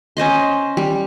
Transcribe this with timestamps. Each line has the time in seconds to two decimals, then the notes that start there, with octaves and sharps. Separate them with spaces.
0.17 C#4 C5 D#5 C6
0.77 G3